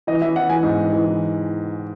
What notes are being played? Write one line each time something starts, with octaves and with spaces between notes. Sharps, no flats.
E3 D#5
E3 E5
E3 F#5
E3 G#5
G#2
E3
E3
E3